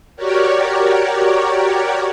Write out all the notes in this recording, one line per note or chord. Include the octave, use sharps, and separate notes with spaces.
F#4 G4 A#4 C#5 D5